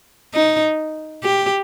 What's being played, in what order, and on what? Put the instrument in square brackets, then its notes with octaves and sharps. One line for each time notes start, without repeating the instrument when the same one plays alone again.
[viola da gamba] D#4
G4